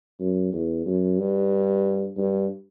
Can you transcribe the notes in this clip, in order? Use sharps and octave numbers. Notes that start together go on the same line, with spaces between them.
F#2
E2
F#2
G2
G2